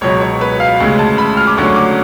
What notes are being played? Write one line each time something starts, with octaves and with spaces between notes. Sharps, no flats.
C#2 B2 F#3 C#5
C#5
B4
F5
D2 C#3 G#3
A5
B5
F6
D6
D2 D3 F#3 C#4 C#6
D6